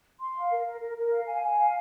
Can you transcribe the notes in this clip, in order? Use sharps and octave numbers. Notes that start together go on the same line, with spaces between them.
C6
F5
A#4
A#4
A#4
A#4
F5
G#5
G#5
F5